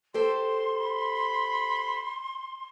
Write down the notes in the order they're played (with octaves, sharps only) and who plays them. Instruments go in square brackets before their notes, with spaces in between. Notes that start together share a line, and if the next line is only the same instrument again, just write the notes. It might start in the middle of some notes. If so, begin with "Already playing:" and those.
[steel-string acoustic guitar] G4 A4 C5 [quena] C6
[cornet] B5